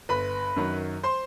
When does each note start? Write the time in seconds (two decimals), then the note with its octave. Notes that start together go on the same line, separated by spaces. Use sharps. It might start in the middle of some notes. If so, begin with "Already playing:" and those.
0.09 G1 B4 B5
0.56 F#2 D#3 F#3
1.03 C5 C6